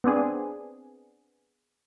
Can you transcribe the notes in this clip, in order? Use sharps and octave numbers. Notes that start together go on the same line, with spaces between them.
B3 C4 D4 G#4